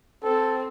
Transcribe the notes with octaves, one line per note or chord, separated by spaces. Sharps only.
C4 A4